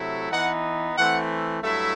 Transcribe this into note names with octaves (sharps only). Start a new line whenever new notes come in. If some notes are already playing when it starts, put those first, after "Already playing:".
Already playing: C3 F#3 A3 E4
E3 B3 D#4 F#5
E3 A3 C4 F#5
G2 F#3 A3 E4 E5